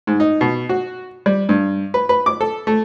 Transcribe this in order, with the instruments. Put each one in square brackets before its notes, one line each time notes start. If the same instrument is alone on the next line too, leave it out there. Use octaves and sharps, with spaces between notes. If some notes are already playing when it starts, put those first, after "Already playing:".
[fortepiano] G#2
D#4
B2
F#4
G3
G2
B4
B4
D6
A4
A3